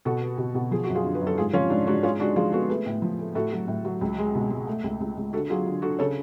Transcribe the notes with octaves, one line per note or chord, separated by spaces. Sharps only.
B2 F#4 A4
B3
B2
B2
F3 G#4
F#2 F#4
F4 G#4
D3
B4
F#2
A4
G#2 F4 G#4
F3 C#4 F4
G#2 D4
G#2 D4 F#4
G#3 C#4 F4
G#3 D4 F#4
F3 F4 G#4
B3 F#4 A4
A3 G#4 B4
A2
F3
A3
A2 F#4 A4
F#3
A2
F#3
C#2
G#3
B2
G#3
A3
C#2
C#2
C#2
D3 F#4 A4
F#3 F4 G#4
D3
D3 F#4 A4
C#3 A4 C#5